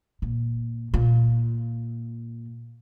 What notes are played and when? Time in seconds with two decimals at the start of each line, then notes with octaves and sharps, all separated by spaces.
0.22 A#2
0.94 A#2